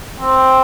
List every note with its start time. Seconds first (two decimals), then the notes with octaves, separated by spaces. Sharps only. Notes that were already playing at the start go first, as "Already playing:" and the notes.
0.20 C4